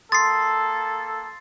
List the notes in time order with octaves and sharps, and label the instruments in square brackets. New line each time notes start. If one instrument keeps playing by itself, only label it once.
[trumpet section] A#3 A4 [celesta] C6 D#6 [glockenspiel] A6 C7